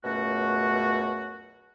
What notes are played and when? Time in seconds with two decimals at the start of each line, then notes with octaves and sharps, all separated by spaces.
0.05 C#2 F#2 B2 A3 F#4